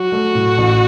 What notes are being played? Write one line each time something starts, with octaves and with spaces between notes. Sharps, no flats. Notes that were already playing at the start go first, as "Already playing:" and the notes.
Already playing: F#3 F#4
A3
A2
A1